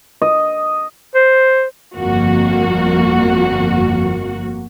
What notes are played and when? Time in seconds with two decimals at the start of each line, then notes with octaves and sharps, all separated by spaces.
0.22 D#5
1.15 C5
1.96 G1 F2 A#3 F#4